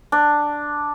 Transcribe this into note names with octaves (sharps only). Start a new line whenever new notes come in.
D4